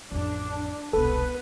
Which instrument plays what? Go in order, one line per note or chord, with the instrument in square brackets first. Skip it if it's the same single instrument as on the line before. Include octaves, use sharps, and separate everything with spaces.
[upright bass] A1 F2 [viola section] D4
[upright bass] E1 C2 [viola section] B3 B4 [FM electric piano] A4